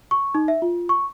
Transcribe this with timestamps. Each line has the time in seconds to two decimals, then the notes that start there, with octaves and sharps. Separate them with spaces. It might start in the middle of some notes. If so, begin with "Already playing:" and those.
0.11 C#6
0.35 D#4
0.48 E5
0.62 F4
0.89 C#6